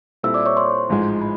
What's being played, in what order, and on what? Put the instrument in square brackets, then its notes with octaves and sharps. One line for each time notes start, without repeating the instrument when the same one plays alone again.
[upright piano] A#2 G3 C4 E4 A4 [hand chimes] E5 E6
[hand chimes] D5 D6
C#5 C#6
C5 C6
[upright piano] A1 G#2 F3 G#3
[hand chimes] B5